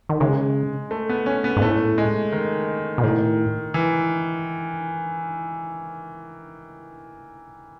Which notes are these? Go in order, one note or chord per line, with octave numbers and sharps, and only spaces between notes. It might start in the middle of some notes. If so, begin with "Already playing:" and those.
D#3
C#3 G#3
A3
B3
C#4
B3
G#2
A2 A3
G#3
D#3
B2
A2 D#3
E3